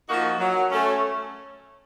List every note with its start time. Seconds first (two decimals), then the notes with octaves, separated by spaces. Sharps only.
0.08 F3 A#3 D#4 F#4
0.39 F#3
0.72 A3 C#4